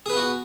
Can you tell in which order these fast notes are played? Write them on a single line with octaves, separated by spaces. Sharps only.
G#4 B4 B3 F#4